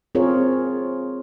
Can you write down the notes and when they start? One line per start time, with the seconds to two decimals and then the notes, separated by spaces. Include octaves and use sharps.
0.15 C4 F4 G#4 A#4 C#5